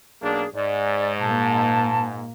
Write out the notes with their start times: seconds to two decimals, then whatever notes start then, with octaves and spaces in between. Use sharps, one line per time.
0.22 B1 A#3 D4 G#4
0.54 G#2 D5
1.19 A#2 A#3 A5